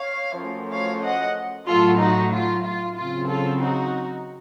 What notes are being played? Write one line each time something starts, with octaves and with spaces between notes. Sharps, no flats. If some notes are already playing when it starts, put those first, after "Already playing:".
Already playing: C#5 F5
F#2 F3 A3
C#5 F5
D#5 F#5
A2 F#3 A3 F4 A4
D#4 F#4
F4
F4
C#3 F#3 C4 F4
F4 A4
D#4 F#4